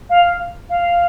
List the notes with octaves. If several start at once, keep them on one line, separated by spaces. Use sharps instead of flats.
F5
F5